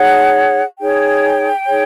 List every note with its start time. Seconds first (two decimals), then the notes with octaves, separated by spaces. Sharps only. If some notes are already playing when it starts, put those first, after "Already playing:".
Already playing: D#4 G#4 C#5 F#5
0.79 D#4 G#4 C#5 G5
1.67 D#4 G#4 C#5